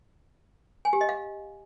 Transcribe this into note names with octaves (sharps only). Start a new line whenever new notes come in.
G#5
G4
D#5
F5